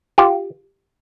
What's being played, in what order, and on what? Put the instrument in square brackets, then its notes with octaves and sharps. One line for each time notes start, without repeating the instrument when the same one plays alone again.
[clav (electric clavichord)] F4 G4